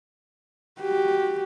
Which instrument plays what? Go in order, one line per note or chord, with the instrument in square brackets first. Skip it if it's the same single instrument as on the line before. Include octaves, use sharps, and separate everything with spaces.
[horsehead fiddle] F#4 G4